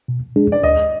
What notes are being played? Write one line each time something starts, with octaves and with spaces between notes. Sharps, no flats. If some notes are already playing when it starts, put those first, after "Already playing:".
B2
G#3 D4 G#4
D5
D2 D#5